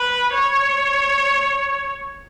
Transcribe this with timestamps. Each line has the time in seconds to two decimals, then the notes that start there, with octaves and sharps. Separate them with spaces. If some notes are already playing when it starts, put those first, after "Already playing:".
Already playing: B4
0.33 C#5